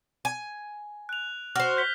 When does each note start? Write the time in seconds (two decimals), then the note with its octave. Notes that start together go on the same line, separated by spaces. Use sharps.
0.25 G#5
1.09 F#6 F7
1.56 F#4 C5 F6
1.77 G6 B6 G7